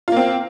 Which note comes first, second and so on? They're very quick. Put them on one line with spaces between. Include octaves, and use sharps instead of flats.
F4 A#3 C4